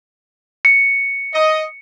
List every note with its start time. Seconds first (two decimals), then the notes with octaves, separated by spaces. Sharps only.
0.65 C#7
1.34 D#5